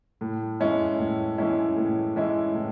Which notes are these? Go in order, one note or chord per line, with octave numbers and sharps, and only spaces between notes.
A2
E3 G#3 C#4 E4
A2
E3 G#3 C#4 E4
A2
E3 G#3 C#4 E4
A2